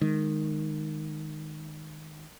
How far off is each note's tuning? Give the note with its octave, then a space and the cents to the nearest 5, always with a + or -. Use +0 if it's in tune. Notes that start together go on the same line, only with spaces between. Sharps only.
D#3 -10 G#3 +0